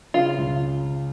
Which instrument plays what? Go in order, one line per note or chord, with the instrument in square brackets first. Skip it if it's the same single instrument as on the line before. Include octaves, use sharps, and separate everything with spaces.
[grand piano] C#3 [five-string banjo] F4
[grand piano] C#2